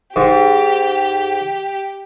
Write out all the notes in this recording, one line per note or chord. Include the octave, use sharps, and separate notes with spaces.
G#2 G4